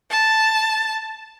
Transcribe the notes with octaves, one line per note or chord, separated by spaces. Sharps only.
A5